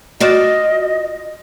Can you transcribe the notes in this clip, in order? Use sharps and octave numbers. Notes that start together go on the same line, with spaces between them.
F4 F#4 D5 D#5